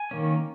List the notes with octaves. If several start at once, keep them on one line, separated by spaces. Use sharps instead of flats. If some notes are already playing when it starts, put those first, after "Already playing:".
Already playing: G#5
D#3 A#3 C#4